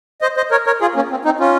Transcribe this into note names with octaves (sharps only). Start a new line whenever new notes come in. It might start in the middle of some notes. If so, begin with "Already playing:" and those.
C5 D#5
C5 D#5
A#4 C#5
A#4 C#5
F4 G#4
A#3 C#4
C4
C4 D#4
C#4 F4